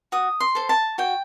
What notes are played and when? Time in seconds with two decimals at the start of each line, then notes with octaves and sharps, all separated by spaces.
0.12 F#4 D#6
0.40 C6
0.55 A4 C5
0.69 A5
0.98 F#4 G5